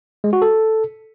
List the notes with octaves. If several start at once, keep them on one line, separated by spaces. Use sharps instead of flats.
G#3
F#4
A4